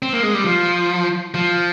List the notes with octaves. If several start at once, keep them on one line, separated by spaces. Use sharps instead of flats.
C4
A#3
G#3
G3
F3
F3